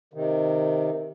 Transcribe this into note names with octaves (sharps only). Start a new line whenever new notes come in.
C3 D#3